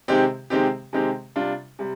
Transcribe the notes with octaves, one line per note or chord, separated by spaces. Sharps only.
C3 D#3 G#3 C4 G4
C3 D#3 G#3 C4 G4
C3 D#3 G#3 C4 G4
C3 G3 D4 F4
C3 G3